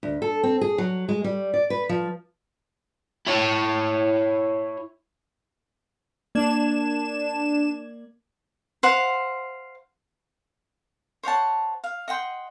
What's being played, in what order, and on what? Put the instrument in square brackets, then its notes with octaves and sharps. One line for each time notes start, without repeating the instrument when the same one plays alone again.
[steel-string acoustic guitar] D2
A4
C4
G#4
F#3
G#3
G3
D5
B4
F3
[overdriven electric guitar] E4 C#5
[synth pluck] A#3 D5 G#6 [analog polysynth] D4 E7
[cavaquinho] C5 F5 F#5
C5 C#5 F#5 A5
F5
D#5 F#5 G5 C6